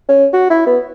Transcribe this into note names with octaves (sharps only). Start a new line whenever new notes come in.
C#4
F#4
E4
B3